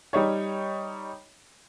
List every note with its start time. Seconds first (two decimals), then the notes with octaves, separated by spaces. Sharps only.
0.13 G3 D#4 C#5